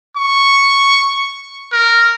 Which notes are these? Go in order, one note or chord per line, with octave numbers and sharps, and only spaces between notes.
C#6
A#4